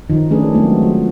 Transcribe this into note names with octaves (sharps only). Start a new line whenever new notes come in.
D#3 F3 D#4
F3 A3 C#4 D4 G#4 B4
F#3 G#3 A3 B3 C4
F3